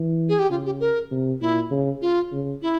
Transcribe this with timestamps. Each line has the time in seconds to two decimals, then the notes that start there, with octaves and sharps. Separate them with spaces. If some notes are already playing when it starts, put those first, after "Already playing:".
Already playing: E3
0.29 G#4
0.39 G4
0.50 C#3 F4
0.66 G4
0.80 A#4
1.11 C3
1.41 A#2 E4
1.71 C#3
2.01 F4
2.32 C#3
2.62 E4